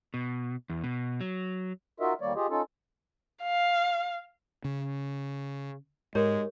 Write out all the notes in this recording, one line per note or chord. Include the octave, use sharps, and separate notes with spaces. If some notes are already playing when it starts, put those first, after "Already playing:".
B2
E2
B2
F#3
D#4 F4 F#4 A#4 D#5 E5
E2 D#3 G3 A#3 C#5 D5
F4 G4 G#4 D#5
C#4 D#4 F4 A4
F5
C#3
G#2 G#3 G4 A#4 C#5